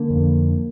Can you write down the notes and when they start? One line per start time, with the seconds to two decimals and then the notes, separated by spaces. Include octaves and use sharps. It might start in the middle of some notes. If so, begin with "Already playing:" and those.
Already playing: D3 A#3
0.10 F2